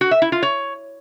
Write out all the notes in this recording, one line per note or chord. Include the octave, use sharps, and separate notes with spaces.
F#4
E5
E4
F4
C#5